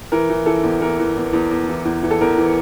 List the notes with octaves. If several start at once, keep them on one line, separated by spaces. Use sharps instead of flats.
E3 A#4
E3
E3 A4
E2
E3 A#4
E3
E2
E2
E2
E3
E2
E3
A4
E2 A#4
E3